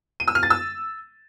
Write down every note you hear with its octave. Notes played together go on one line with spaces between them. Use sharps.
D#7
E6
F6
A6
E6